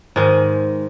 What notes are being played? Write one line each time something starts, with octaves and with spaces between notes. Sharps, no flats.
G#2 D#3 G#3